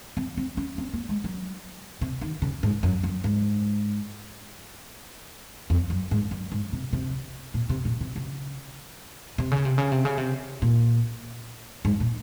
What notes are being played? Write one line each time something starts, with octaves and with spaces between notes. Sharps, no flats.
C4
C4
C#4
C4
A#3
G#3
F#3
C3
D#3
C#3
G#2
F#2
F#2
G#2
F2
F#2
G#2
F#2
G#2
C3
C3
A#2
C3
A#2
C3
C#3
C3
C#3
C3
C#3
C3
C#3
C3
A#2
G#2
A#2